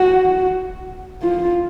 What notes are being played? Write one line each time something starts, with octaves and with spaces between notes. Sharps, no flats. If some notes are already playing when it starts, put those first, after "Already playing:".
Already playing: F#4
F4